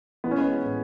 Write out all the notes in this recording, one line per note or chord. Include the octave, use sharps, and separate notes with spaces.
E3 B3
C#4
G#3 B3
A2